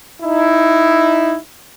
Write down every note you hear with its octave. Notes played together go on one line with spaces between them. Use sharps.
D#4 E4